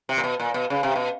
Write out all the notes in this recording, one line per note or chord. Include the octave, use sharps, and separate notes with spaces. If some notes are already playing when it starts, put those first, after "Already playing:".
C3
A#2
B2
A#2
B2
C#3
C3
B2